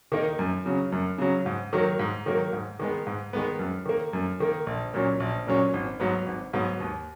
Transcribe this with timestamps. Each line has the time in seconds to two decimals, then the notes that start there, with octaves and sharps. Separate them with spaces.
0.12 D#3 A#3 D#4
0.39 F#2
0.66 C#3 F#3
0.92 F#2
1.18 C#3 F#3
1.46 G#2
1.73 D#3 F#3 A#3
1.99 G#2
2.26 D#3 F#3 A#3
2.53 G#2
2.79 D#3 G#3 B3
3.07 G#2
3.33 D#3 G#3 B3
3.59 F#2
3.86 D#3 A#3
4.13 F#2
4.40 D#3 A#3
4.66 A#1
4.94 A#2 F#3 C#4
5.20 A#1
5.47 A#2 F#3 C#4
5.73 G#1
6.00 G#2 F#3 B3
6.26 G#1
6.53 G#2 F#3 B3
6.80 D#2